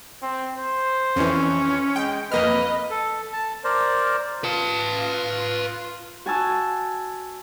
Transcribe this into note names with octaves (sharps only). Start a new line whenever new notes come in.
C4
C5
F2 E3 C#4
G#3 G5
F2 A#3 B4 D#5 F6
A4
A5
A#4 C5 D5
F4 B4 A5
F#4 G#5 A5 E6